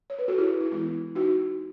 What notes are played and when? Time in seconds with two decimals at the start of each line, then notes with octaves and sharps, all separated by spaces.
0.10 C#5
0.19 B4
0.28 F#4 A4
0.38 E4 G#4
0.61 E4
0.71 E3 G#3 B3 E4
1.15 D#4 F#4